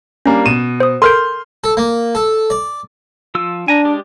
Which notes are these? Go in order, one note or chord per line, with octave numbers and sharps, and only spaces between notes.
G3 A#3 C#4 D4
B2 D#7 E7
C5 D#6
A4 A#4 C6 F6 G6 D7
A4
A#3
A4
D5
F3 F4 E6
D4 G#5 A#5
G#3 G4 D5